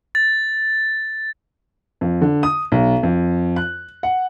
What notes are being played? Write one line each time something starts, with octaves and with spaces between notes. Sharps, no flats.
A6
F2
D3
D#6
B1
F2
F#6
F#5